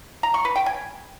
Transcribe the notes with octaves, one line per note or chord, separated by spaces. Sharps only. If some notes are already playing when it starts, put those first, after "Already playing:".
A#5
C#6
B4
G5
G#5